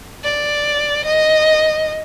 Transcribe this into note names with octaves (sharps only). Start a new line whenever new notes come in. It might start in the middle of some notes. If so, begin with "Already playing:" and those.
D5
D#5